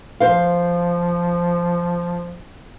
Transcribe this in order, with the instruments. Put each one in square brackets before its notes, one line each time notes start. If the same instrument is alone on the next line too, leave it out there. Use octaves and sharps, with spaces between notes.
[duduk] F3 [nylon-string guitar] C5 F5